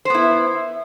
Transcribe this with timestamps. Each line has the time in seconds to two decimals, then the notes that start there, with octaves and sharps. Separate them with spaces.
0.05 C5
0.10 B3
0.14 E4